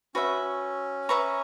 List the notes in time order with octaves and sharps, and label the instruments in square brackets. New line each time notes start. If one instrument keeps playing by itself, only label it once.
[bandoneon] C#4 [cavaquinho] F#4 B4 E5
[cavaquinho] B4 E5 A#5 C#6